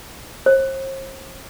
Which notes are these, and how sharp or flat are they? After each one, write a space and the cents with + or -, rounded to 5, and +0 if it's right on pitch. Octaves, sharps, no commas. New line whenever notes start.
C5 +40